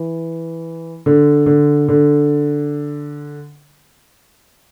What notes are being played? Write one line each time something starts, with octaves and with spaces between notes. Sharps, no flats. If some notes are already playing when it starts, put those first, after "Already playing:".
Already playing: E3
D3
D3
D3